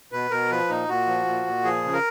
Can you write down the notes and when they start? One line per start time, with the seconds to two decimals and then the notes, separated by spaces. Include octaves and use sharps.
0.12 B2 B4
0.31 B2 A#4
0.50 F3 B4
0.69 A#2 D#4
0.89 A#2 F#4
1.07 F3
1.26 A#2
1.46 A#2
1.64 F3 G#4
1.83 C#3
1.93 A#4